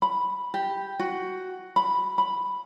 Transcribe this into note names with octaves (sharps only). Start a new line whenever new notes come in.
B5
G4
F#4
B5
B5